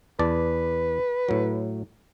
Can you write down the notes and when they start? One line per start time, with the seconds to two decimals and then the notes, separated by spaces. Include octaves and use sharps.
0.19 E2 B4 D5 A5
1.29 A2 F#3